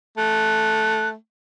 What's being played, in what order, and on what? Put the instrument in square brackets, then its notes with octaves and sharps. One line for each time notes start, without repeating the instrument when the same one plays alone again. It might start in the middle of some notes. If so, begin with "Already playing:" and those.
[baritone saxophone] A3 [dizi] F#6